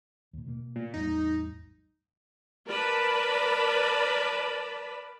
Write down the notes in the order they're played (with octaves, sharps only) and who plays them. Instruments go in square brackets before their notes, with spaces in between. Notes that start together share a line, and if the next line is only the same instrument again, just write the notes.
[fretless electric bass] D#2 A#2
B2 A#3
[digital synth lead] A#2
[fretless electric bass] A1 E2 G3 [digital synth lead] D#4
[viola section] A#4 B4 D5 A5 B5